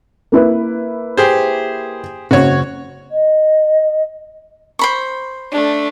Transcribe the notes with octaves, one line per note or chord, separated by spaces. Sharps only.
A#3 E4 B4
G4 G#4 C5
F#1 F#4 C#5
D#5
C5 B5 C#6
A3 D4